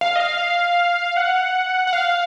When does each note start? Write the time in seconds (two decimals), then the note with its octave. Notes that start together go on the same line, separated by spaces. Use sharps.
0.01 F5
0.16 D#5
0.20 F5
1.17 F#5
1.87 F#5
1.93 F5